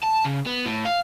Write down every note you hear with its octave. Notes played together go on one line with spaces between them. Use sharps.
A5
C#3
B3
A2
F5